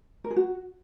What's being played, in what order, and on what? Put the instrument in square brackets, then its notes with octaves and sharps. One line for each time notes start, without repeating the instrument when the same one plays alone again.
[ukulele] A#4
G#4
F#4